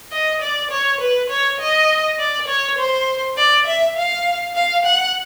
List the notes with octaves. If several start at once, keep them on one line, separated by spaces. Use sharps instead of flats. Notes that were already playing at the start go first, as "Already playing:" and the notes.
D#5
D5
C#5
B4
C#5
D#5
D5
C#5
C5
D5
E5
F5
F5
F#5